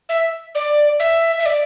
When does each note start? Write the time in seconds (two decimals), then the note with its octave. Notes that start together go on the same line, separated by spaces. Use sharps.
0.09 E5
0.55 D5
0.99 E5
1.39 E5
1.45 D5